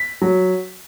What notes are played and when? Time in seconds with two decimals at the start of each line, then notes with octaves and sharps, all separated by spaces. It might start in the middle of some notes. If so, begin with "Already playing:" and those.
Already playing: B6
0.22 F#3